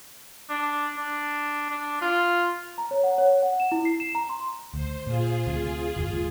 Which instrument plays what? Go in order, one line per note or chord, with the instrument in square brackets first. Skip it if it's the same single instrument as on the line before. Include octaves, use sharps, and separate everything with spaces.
[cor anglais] D4
D4
D4
F4
[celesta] A#5
C#5
F#5
C#5
F#5
E7
E4
C7
E7
A#5
C6
[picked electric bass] D2 [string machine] C5
[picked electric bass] A#2 [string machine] F4 G#4
[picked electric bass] D2 C3
F#1 D#2 G#2